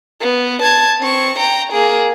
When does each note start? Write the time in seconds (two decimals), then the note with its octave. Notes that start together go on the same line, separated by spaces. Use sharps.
0.21 B3
0.62 A5 G#6
1.00 C4 C#6
1.39 G5 A#5
1.72 A#3 G#4